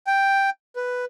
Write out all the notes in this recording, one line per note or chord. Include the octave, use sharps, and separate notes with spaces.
G5
B4